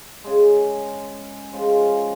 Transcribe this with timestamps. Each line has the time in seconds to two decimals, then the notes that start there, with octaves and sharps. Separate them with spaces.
0.24 C#3 G#3 G#4
1.53 C#3 F3 G#3 F4
1.63 D#4
1.74 F4